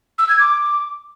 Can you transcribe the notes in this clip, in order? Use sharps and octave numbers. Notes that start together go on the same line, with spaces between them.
E6
G#6
D6